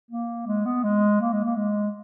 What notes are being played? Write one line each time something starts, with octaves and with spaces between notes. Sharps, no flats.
A#3
G#3
B3
G#3
A#3
G#3
A#3
G#3